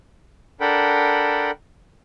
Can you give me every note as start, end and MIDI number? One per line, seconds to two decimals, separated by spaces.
0.61 1.51 62
0.61 1.51 69
0.61 1.51 70
0.61 1.51 78
0.61 1.51 79
0.61 1.51 83